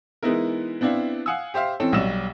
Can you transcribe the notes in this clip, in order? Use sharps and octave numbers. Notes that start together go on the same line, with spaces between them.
E3 G#3 B3 D#4 E4 A#4
B3 C4 D4 E4 F5
F5 F#5 G#5 D#6 E6
G4 C5 E5 F5
E3 C4 C#4 A4
B1 F#3 G3 E6 E7